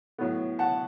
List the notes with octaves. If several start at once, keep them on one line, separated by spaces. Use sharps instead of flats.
A2 F#3 B3
F#5 A5